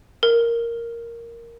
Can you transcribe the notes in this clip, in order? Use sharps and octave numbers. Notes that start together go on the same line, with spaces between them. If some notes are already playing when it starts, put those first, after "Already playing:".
A#4